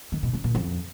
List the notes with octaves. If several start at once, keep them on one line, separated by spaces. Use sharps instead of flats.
D#3
B2
C#3
A#2
F2